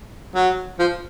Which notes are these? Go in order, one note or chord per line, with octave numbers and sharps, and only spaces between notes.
F#3
F3